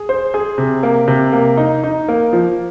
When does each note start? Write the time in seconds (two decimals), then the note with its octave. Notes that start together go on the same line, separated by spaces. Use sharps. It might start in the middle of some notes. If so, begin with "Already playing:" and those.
Already playing: G#4
0.09 C5
0.34 G#4
0.58 C3
0.83 A#3
1.08 C3
1.33 A#3
1.57 D#4
1.84 D#4
2.08 A#3
2.33 F3